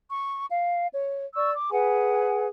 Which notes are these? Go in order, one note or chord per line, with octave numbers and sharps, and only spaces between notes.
C#6
F5
C#5
D5 C#6 E6
D6
G#4 B4 F#5 G#5